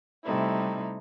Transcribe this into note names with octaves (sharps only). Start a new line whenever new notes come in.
C3 G3 A3 D#4 E4